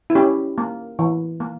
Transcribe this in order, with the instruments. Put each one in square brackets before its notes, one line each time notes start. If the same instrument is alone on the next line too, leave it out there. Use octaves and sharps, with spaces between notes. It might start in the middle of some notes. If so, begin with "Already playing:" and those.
[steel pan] E4
C#4 G4
A#3
E3
A#3